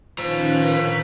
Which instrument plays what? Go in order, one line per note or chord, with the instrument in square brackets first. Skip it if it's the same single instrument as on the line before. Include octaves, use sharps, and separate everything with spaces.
[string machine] D#3 C#4 B4 [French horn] F3 [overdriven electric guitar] C5 A#5